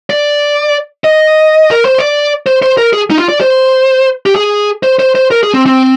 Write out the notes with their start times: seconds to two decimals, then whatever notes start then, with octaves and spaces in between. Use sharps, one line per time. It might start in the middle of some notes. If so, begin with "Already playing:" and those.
0.10 D5
1.04 D#5
1.71 A#4
1.85 C5
1.98 D5
2.46 C5
2.62 C5
2.77 A#4
2.93 G#4
3.10 D#4
3.18 F4
3.29 D5
3.41 C5
4.26 G4
4.36 G#4
4.83 C5
4.99 C5
5.15 C5
5.31 A#4
5.43 G#4
5.54 C4
5.66 C4